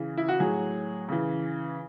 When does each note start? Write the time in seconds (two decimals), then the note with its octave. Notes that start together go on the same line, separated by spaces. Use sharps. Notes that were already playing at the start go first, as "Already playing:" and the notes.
Already playing: C#3 E3
0.17 E4
0.28 F#4
0.40 A2 F#3 G#4
1.09 C#3 E3